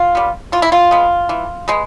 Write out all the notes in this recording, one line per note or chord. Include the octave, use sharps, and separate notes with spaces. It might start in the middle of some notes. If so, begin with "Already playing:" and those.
Already playing: F4
G3 B3
E3 F4
E4
F4
G#3 B3
E3
G#3 B3